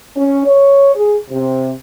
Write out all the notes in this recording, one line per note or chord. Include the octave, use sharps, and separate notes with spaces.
C#4
C#5
G#4
C3